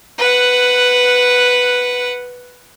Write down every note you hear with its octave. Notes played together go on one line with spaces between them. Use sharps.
B4 F#5